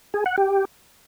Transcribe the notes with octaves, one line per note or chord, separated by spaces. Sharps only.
G#4
F#5
G4